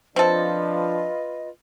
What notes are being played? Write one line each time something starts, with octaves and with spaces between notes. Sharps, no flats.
F3 C4 D4 F4 A4 B4 D#5